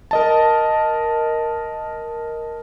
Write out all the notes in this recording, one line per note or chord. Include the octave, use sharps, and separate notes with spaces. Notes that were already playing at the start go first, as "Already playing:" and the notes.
A#4 D#5 A5